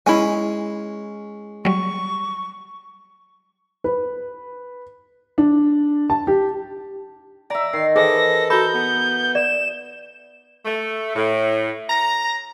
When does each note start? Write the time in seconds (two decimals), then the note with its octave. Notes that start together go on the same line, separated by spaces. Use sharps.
0.06 G#3 C#4 E4 G#5
1.65 F#3 G3 C#6
3.84 B4
5.38 D4
6.10 A5
6.27 G4
7.50 D5 E5 A#5
7.73 D#3 C7
7.96 E3 G#4 A4 C5 D#5 G5 A#6
8.50 F#4 A4 A#5 B5 G6
8.74 B3
9.35 D5 E7
10.65 A3
11.15 A2
11.88 A#5